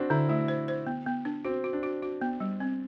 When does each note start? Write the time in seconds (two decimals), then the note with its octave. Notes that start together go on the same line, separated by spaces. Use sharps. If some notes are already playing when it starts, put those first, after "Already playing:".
Already playing: C4 D4 F#4
0.10 D3 E4
0.29 A3 E4
0.48 C5
0.68 C5
0.87 B3
1.06 B3
1.25 D4
1.45 C4 F#4
1.64 F#4
1.73 D4
1.83 F#4
2.02 F#4
2.21 B3
2.40 G3
2.60 C4